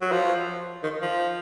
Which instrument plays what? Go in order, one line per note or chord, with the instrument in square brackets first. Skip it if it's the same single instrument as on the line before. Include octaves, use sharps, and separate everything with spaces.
[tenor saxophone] F#3
F3
D#3
F3